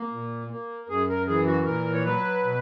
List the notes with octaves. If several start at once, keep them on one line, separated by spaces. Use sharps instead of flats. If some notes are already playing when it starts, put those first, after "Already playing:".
Already playing: A#3
A#2
A#3
F#2 G#4
A#4
E3 G#4
F#4
A#2 A#4
C#5
F#3 B4
B2